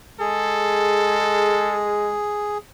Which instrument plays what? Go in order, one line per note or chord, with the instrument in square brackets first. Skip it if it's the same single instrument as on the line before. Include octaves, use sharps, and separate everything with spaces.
[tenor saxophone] G#3 [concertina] G#4 [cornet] A4